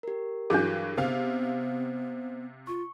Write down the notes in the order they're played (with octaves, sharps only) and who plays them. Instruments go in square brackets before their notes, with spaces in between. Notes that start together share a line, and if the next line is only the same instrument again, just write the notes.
[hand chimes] G4 A#4
[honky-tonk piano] G2 E3 F#3 [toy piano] D4 G#4
[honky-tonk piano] C3 F5 [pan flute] B3 [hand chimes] C5
[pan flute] F4 [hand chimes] C#6